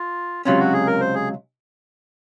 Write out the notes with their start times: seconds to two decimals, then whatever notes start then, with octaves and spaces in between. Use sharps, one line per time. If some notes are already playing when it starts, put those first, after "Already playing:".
Already playing: F4
0.45 C#2 C3 F#3 C#4 F4
0.59 F#4
0.73 G#4
0.87 A#4
1.01 C5
1.15 G#4